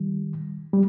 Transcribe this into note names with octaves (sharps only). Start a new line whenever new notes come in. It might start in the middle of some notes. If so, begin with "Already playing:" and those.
Already playing: D#3 G3
G3